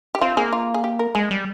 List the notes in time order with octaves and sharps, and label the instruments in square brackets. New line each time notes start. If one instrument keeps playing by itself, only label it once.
[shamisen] G4
[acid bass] C4 [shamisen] F4
[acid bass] A#3 [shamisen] G#4
[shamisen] F4
G#4
G4
A#4
[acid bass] G#3 [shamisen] G#4
[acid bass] G3